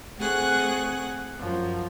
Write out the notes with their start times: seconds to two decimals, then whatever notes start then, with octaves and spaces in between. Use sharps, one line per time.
0.18 A3 C4 G#4 F#5 C#6 F#6
1.39 F#2 F3